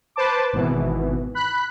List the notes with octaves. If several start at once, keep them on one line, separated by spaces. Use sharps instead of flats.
B4 C5 A5 D6
G#1 B2 E3
B5 F#6